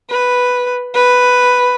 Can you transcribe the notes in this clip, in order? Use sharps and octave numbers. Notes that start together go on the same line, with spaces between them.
B4
B4